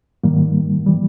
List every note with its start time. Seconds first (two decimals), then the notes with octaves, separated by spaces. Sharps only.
0.24 G#2 D#3 G3 A#3
0.86 E3 G3